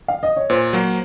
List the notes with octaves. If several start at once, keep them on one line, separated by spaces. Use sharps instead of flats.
F5
D#5
C#5
A#2 C5
F#3 A#3